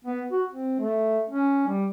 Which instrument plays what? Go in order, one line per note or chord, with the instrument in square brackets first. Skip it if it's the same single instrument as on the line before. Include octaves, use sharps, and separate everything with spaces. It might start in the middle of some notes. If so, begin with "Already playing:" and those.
[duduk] B3
F#4
C4
A3
C#4
G3